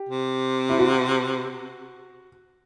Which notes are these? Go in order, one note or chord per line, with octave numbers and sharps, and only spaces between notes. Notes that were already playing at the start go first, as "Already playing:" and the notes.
Already playing: G4
C3
E4
F#4